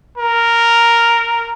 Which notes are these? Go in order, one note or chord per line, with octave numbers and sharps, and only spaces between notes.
A#4